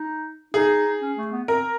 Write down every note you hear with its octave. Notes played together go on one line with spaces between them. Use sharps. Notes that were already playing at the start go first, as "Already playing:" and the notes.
Already playing: D#4
D#4 G#4
C#4
A3
B3
C4 A#4